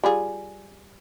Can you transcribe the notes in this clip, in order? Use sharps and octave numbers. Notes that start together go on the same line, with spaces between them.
G3 F4 G#4